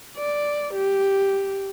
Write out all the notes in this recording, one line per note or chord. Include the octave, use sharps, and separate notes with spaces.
D5
G4